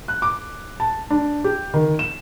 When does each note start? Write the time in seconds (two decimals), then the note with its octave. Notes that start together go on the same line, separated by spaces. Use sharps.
0.08 F#6
0.22 D6
0.80 A5
1.10 D4
1.44 G4
1.74 D#3
1.99 E7